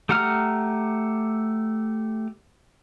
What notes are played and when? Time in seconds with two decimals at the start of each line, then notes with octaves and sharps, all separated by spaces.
0.09 A3 G4 F#5 A#5 F6